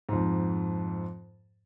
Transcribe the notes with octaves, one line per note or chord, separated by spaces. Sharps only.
F2 G#2